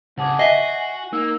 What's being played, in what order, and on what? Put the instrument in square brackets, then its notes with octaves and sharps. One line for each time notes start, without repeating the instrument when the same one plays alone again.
[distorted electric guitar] C2 G#4 [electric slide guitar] C#3 [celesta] F#5 A5 D6
[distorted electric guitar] F#4 [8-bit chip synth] D#5 E5 [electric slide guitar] G#5 [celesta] C7
[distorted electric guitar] A#3 [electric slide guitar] D#4 [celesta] E6